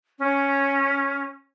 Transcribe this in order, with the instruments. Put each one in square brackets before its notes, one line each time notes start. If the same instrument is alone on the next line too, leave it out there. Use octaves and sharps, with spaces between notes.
[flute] C#4